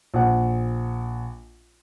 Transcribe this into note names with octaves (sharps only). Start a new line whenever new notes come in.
A#1 F#5